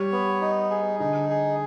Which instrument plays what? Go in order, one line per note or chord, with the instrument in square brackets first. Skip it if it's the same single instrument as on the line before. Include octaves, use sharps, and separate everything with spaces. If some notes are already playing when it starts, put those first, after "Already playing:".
Already playing: [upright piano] G3 [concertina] C#5
[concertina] B3
D#4
G#4
[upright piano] D3 [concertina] D#4
[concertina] G#4